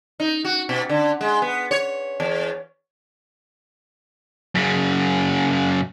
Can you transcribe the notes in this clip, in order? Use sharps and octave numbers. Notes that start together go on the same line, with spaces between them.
D#4
F#4
B2
D3
G#3
B3
C#5
E2
F#2 C#3